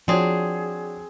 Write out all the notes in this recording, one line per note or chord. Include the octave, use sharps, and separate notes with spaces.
F3 C4 D4 F#4 G#4 C#5